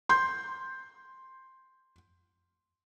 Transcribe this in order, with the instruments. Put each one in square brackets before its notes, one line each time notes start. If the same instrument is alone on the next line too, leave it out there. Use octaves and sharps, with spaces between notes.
[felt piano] C6 G6